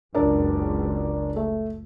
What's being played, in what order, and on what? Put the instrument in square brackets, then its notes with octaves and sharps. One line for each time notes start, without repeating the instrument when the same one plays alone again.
[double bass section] F#1 C#2 [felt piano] D4 A#4 D5
[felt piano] A3